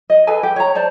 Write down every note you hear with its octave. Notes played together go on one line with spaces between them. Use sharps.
D#5
G#4 A4 B4 G#5
G4 G5
C#5 A#5
C5 D5 A5